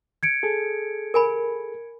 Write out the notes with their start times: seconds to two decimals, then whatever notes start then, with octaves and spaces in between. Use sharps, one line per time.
0.23 G#6 C#7 D7
0.43 G#4 A4
1.14 A#4 G#5 B5